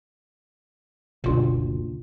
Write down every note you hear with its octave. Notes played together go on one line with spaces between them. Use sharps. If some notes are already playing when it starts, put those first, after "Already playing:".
F#1 D2 B2 F4